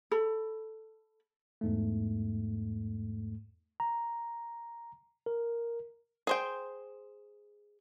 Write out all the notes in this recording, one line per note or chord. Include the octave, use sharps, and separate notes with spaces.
A4 B5
E2 G#2 A3
A#5
A#4
G#4 C5 G5